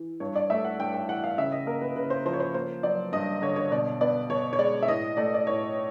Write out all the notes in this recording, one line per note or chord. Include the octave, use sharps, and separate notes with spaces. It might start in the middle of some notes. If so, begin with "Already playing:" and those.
Already playing: E3
G2 C#5
D5
A3 E5
F#5
G2 G5
G5
E3 F#5
F5
C#3 E5
D#5
A#3 A#4
B4
C#3 B4
C5
F3 C5
C#5
C5
A#3 C5
F#3 D5
G2 D#5
D3 C#5
C#5
B2 D5
B3 D5
B2 C#5
C#5
G#3 D5
E5
A2 D#5
A3 D5
D5
A2 C#5